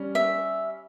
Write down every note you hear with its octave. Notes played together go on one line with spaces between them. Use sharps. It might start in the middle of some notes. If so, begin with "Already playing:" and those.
Already playing: G3 C#4
E5